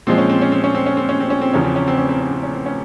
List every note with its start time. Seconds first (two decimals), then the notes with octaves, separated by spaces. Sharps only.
0.07 A#2 F3 G#3 C4
0.18 C#4
0.29 C4
0.42 C#4
0.52 C4
0.64 C#4
0.75 C4
0.86 C#4
0.97 C4
1.09 C#4
1.20 C4
1.30 C#4
1.41 C4
1.53 E2 C#3 F3 C#4
1.64 C4
1.76 C#4
1.88 C4
1.98 C#4
2.09 C4
2.20 C#4
2.32 C4
2.43 C#4
2.54 C4
2.66 C#4